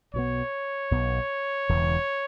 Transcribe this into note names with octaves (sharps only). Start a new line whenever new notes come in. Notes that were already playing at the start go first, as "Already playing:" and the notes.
B1 B2 B3 C#5
B1 B2 B3
E1 E2 C#3 E3